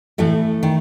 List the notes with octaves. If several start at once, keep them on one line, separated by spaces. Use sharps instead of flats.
A2 E3 A3
D#3